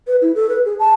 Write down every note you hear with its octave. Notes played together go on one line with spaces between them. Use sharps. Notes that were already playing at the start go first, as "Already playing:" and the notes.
B4
E4
A4
B4
G#4
A5